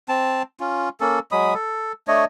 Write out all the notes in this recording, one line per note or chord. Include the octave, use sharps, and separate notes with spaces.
C4 A5
C#4 F4
A#3 C#4 A4
F#3 G#3 B5 D#6
A4
A3 D4 C#5 D#5